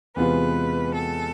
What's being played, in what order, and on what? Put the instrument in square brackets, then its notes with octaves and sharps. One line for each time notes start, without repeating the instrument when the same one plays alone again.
[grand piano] E2 C3 G#3 B3 F4 [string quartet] B4
[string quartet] A4